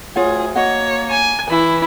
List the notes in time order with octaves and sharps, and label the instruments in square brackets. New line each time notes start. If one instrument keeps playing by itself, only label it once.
[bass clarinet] D2 [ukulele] F4 C#5 F#5 [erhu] G#4
[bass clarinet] A#3 [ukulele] F#4 D#5 F#5 [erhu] C#5
[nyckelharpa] G#5
[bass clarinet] E3 [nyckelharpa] E4 [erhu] B5